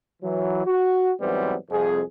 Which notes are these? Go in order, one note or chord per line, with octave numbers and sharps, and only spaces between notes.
E3 F#3
F#4
G#2 E3 F#3 G3 B3 C4
C2 F2 G#4